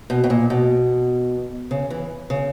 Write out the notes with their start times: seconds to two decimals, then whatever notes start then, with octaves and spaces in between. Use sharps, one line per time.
0.10 B2
0.24 B2
0.30 A#2
0.50 B2
1.71 C#3
1.90 E3
2.30 C#3